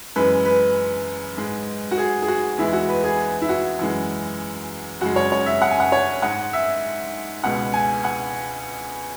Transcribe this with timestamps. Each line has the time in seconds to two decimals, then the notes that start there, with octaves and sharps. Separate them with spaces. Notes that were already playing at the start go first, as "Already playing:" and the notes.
0.16 F#2 E3 G#3 B4
0.45 B4
1.37 G#2 G#3
1.91 F#4
1.98 G#4
2.22 G#4
2.28 F#4
2.58 E2 E3 G#3 E4
2.73 F#4
2.89 B4
3.04 G#4
3.42 E4
3.49 F#4
3.79 F#2 E3 G#3
5.01 F#2 C#3 G#3 F#4
5.16 C#5
5.32 C#5
5.46 E5
5.62 F#5
5.71 G#5
5.80 F#5
5.92 C#5
6.22 G#2 G#3 F#5
6.53 E5
7.44 C#2 B2 G#3 F#5
7.74 G#5
8.04 F#5